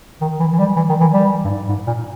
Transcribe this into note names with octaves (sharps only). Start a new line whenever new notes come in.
D#3
E3
E3
G3
E3
D#3
E3
G3
G2
G#2
G#2
A#2